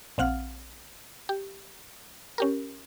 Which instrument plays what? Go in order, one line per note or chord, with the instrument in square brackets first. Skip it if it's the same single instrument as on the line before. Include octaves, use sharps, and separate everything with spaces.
[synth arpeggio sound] A#1 C4 F5 F#5 F6
G4
C#4 G4 A#4